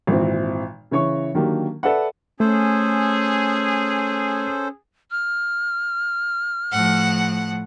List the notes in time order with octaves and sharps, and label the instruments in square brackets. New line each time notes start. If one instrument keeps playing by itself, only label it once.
[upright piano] G#1 A#2 E3 C4
C#3 E3 C#5 C#6
D3 D#3 F#3 A#3 D4 G4
A4 B4 D5 E5 F#5
[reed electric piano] A3 [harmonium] C#4 [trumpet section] G#4 [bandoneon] A4 C5
[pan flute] F6
[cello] A2 F3 [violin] F#5